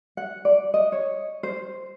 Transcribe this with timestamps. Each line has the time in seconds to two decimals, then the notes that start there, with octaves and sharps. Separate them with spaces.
0.17 F#5
0.45 D5
0.74 D#5
0.92 C#5
1.43 C5